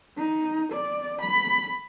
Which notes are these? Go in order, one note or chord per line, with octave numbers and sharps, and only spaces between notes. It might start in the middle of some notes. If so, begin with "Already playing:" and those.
D#4
D5
B5